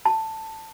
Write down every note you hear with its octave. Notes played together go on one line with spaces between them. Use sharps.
A5